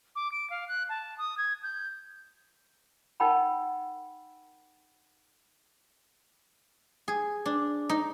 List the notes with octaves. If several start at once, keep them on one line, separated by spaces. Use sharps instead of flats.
D6
D7
F5
F#6
A5
D#6
G#6
G6
D#4 A#4 F#5 G5 A5 B5
G#4
D4
D#4